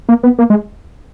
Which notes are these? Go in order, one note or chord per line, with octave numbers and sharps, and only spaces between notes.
A#3
B3
A#3
G#3